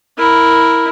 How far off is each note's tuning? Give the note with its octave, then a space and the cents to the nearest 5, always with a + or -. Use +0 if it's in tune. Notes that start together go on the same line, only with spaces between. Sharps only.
E4 -5 A#4 +0